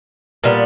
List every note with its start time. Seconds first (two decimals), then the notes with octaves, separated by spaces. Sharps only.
0.44 A#2 G3 B3